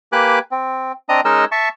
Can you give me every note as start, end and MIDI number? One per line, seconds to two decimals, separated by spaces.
0.12 0.39 58
0.12 0.39 67
0.12 0.39 71
0.12 0.39 80
0.12 0.39 86
0.12 0.39 90
0.51 0.92 60
1.09 1.21 60
1.09 1.21 62
1.09 1.21 75
1.09 1.21 82
1.09 1.21 87
1.25 1.45 56
1.25 1.45 61
1.25 1.45 63
1.25 1.45 70
1.25 1.45 75
1.25 1.45 88
1.52 1.69 76
1.52 1.69 81
1.52 1.69 85